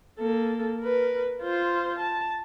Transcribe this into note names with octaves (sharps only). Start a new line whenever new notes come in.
A#3 A4
A#4 B4
F4 C5
A5